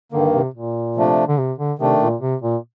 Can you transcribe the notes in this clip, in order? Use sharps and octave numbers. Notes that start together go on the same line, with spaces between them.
G2 D3 D#3 A#3
C3
A#2
C3 F3 A3 D4
D3
C3
D3
C3 D#3 A3 D4
A#2
C3
A#2